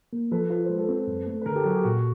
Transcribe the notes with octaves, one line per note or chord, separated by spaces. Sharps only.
A#3
F3 A4 B4
F4 B4
G#3 C5
A4 B4
C4
F#2
A3
B4
D3 G#4 A#4
G4 A4
F#3 F#4 G#4
G4
A#2 F#4